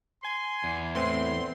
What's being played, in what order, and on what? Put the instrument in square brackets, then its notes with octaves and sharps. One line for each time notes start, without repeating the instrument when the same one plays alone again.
[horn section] G#5 C6
[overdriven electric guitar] E2
[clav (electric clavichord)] A2 E3 [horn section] C4 [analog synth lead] C6